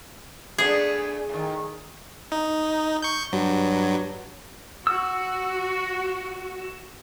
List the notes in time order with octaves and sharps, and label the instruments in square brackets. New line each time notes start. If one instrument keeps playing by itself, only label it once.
[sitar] A3 B3 D4 [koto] G#4
[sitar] A2 D#3
[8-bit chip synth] D#4
C#6 G6
G2 F#3
[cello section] F#4 [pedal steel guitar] E6